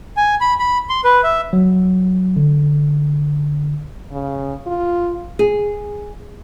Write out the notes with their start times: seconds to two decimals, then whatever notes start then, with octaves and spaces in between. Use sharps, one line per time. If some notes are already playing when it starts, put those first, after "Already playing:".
0.17 G#5
0.41 B5
0.59 B5
0.89 C6
1.04 B4
1.23 E5
1.53 F#3
2.36 D3
4.11 C#3
4.67 F4
5.39 G#4